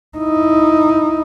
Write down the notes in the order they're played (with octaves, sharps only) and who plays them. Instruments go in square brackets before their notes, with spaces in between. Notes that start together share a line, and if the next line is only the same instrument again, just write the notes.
[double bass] D#4 E4